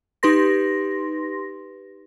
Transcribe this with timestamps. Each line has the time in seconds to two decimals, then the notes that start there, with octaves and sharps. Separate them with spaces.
0.23 D#4 G4 B4 C6 A#6